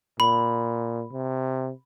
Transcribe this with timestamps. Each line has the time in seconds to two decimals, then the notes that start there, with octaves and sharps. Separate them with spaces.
0.20 A#2 B5
1.12 C3